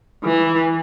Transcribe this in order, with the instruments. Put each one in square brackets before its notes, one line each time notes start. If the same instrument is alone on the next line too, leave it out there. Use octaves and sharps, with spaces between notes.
[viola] E3